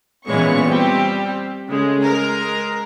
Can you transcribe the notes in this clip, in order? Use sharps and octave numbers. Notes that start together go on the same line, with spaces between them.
A#2 E3 G#3 B3 C#4 C#6
G3 C4 G4
C#3 G#3 A3
G#3 A#4